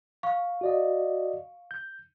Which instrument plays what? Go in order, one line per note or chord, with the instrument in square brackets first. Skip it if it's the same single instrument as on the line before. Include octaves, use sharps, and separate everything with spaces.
[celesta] F5 C#6
[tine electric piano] F#4 D5 D#5
G6